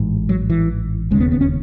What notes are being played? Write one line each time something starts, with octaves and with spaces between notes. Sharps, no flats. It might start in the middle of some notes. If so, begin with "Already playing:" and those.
Already playing: A1 G#2
F#3
E3
E1 D#2 C#3 G#3
B3
B3
C#4